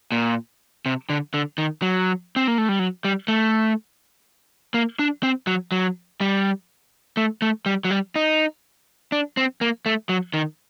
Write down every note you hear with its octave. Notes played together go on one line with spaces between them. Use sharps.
A#2
C3
D3
D3
D#3
F#3
C4
A#3
A3
G3
F#3
G3
A3
A#3
D4
C4
F#3
F#3
G3
A3
A3
G3
F#3
G3
D#4
D4
C4
A#3
A3
F#3
D#3